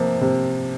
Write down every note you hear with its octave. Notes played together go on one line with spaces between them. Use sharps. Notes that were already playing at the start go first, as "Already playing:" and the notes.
Already playing: C3 F3 A#3
C3